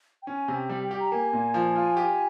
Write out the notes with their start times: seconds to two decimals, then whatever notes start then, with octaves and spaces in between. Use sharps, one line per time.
0.22 G5
0.27 C#4 G#5
0.48 C3
0.55 G5
0.69 G3
0.84 G5
0.91 G4
1.00 A#5
1.11 A#3 G#5
1.33 A#2
1.54 F3
1.76 F4
1.97 G4